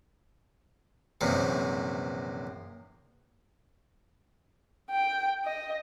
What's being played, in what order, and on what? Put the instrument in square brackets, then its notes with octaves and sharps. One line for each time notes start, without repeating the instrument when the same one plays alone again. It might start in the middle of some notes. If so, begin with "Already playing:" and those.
[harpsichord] A#1 F#2 C3 E3
[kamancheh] G5
D#5